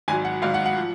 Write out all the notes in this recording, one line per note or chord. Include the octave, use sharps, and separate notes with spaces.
G#1 G#2 F#3 G#5
F#5
G#1 G#2 F#3 F5
F#5
F#5
F3